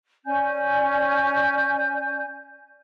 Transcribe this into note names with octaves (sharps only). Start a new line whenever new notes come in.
C#4 D5 G#5 G6